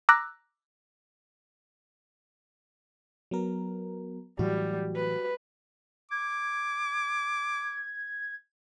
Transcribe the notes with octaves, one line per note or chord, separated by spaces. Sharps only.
A#5 D6 E6 F#6 A#6
F#3 B3 A#4
A2 E3 F#3 G3 F#4
B4
D6 G#6